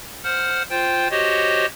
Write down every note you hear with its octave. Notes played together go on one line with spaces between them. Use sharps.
C5 F#5 F6
F4 C5 G5
F#4 G4 C5 C#5 D#5